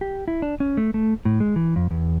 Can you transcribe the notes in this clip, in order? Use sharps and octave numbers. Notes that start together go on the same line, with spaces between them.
G4
E4
D4
C#4
A3
A3
A2
G#3
E3
F2
E2